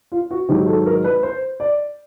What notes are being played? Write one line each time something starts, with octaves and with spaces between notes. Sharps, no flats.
F4
F#4
G#2 D#3 F#3 G4
A4
A#4
B4
C5
D5